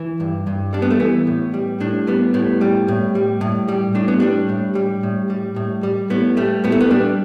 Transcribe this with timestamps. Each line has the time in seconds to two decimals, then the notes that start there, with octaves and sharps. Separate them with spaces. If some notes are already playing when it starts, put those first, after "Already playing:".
Already playing: E3 E4
0.20 G2
0.47 G2
0.73 G3 D4
0.82 B3
0.91 A3
1.00 E3 B3
1.27 A2
1.54 G3
1.80 A2 D4
2.07 G3 B3
2.34 A2 B3
2.61 G3
2.88 A2
3.15 G3
3.41 A2
3.68 G3
3.95 A2 D4
4.08 B3
4.20 G3 D4
4.49 A2
4.75 G3
5.03 A2
5.30 G3
5.56 A2
5.83 G3
6.10 A2 B3
6.37 G3 A3
6.64 A2 B3
6.72 A3
6.80 B3
6.91 G3 D4